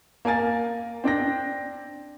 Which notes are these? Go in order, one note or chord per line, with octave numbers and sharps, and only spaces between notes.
A#3 A#4 G#5 A6
C4 D4 G5 A#6